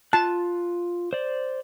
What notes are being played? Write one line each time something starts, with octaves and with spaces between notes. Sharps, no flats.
F4 A5 F#6
C5 D5